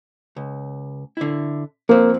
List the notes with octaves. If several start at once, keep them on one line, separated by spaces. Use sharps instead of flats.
C#2
D3 E4
F3 A#3 C4